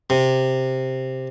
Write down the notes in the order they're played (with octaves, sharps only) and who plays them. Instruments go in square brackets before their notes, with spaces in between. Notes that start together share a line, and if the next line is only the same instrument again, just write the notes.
[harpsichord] C3